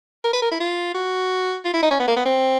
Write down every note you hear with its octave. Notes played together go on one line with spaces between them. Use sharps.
A#4
B4
A#4
E4
F4
F#4
F4
E4
D#4
C#4
B3
A#3
B3
C4